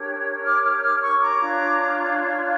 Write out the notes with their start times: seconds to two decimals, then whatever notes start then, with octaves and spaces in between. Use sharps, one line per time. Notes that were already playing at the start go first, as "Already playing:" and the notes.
Already playing: D4 G4 A#4 C#5
0.45 D6 F6
0.63 D6 F6
0.77 G6
0.82 D6 F6
1.02 C#6 E6
1.20 A#5 D6
1.38 D4 F4 C#5